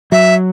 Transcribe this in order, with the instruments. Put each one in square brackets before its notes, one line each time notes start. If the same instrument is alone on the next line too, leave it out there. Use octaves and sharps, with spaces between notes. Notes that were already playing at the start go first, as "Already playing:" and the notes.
[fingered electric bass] F#3 [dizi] E5